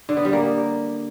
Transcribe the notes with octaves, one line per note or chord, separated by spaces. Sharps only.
D3
B3
G3
A#3